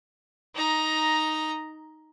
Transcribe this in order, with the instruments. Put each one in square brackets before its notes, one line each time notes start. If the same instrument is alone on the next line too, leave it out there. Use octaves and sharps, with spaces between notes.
[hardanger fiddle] D#4 A#5